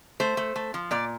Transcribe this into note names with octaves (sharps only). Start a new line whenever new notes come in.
A3 C5
A3
A3
F3
A#2 D5